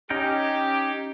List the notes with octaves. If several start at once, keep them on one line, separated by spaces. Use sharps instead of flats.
C#4 D#4 G4 G5